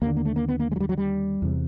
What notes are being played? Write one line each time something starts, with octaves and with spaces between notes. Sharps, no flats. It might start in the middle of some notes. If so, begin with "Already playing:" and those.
D#2 D3 A#3
A#3
A3
A#3
B3
A#3
G#3
F#3
G3
F#3
G3
E2 C3